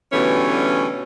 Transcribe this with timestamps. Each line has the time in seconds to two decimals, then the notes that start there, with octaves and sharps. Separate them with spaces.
0.12 B2 D3 E3 G3 A3 C#4